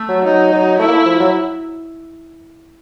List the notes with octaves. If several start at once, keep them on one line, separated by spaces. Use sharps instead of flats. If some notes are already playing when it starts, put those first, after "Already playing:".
Already playing: A3
F#3
F#3 D#4
F#3
A3 E4
A#3
A3
F3
F#3